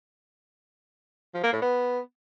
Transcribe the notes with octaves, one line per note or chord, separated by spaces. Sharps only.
F3
A#3
A2
B3